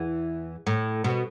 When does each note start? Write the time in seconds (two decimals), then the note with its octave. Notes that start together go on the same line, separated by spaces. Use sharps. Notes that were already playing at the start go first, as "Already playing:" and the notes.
Already playing: E2 E3
0.67 A2
1.04 B2